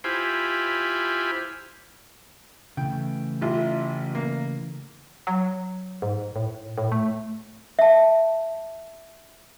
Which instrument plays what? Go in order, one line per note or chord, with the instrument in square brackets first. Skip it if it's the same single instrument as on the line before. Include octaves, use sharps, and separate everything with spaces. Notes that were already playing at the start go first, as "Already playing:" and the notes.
[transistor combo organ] E4 F4 G4 C5 G#5 B5
[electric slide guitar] C#3 E3 A3 [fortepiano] G5
[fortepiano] A1 E4 F4
A#3
[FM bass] F#3
G#2
A2
A2
A3
[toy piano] E5 A5